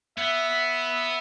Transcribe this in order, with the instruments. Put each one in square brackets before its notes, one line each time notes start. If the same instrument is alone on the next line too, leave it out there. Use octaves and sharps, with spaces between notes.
[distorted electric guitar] B3 [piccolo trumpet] E5